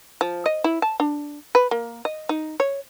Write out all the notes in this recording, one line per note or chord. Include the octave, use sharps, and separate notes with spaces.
F3
D#5
E4
A5
D4
B4
A#3
D#5
D#4
C#5